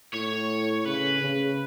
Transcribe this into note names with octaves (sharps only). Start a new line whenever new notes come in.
A2 C#5
C#3 B4
C#3